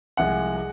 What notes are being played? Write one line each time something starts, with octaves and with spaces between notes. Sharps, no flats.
C2 C3 F3 G#3 F#5
G#3